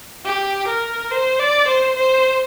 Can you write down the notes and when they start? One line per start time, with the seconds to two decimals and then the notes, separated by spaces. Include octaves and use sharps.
0.25 G4
0.68 A#4
1.11 C5
1.39 D5
1.68 C5
1.96 C5